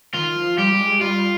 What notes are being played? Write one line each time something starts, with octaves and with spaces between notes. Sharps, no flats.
D#3 F4
F3
G3 G4
G3
G#3
G3 F4